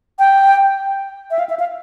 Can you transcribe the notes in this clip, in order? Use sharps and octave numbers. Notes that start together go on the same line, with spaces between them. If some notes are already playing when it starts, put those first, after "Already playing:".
G5
E5
F5
E5
F5